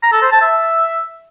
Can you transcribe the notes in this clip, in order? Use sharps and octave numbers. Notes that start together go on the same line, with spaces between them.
A#5
A4
C5
A5
E5